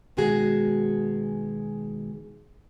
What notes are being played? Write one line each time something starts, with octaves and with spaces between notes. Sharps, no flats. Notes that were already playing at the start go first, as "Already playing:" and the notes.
B2 D#3 G#3 F#4 G#4